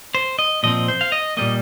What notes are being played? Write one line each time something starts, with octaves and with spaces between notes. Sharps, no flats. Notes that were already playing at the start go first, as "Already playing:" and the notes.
C5
D#5
A#2 F3 C4 D#5
C5
F5
D#5
A#2 G3 A#3 D#5